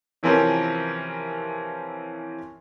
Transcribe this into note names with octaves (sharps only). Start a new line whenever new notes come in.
C3 E3 F3 C4 C#4 A#4